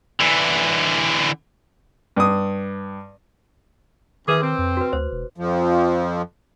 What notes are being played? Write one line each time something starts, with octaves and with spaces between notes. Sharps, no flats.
D3 E3
G2 D#6
E2 D#3 E3 G#4 B4 D6
C3 C4
F2
F#4 B4
D2 C5
E1
F2 F3